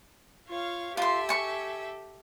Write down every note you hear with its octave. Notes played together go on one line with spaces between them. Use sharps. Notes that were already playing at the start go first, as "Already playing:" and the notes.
F4 C#5 F5
F4 G4 A4 E5 C6
G#5 C#6